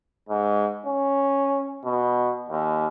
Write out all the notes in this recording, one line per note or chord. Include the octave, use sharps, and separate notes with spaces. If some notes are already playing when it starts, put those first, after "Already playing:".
G#2
C#4
B2
D#2